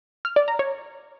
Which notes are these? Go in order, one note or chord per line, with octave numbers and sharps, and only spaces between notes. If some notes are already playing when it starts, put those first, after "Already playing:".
F6
D5
A#5
C#5